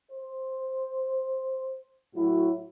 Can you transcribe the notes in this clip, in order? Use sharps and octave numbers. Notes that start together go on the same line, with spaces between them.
C5
A2 F#3 E4 F#4